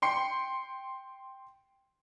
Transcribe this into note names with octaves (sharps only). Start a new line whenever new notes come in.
G5 C6 C7 C#7